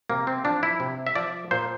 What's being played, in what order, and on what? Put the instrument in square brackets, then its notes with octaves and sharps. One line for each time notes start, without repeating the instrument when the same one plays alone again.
[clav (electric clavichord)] C3 A#3
C4
F3 D4
E4
C3
E5
F3 D5
A#2 C5